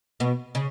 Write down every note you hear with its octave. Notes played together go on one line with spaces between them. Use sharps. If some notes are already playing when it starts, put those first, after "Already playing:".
B2 B3
C#3 C#4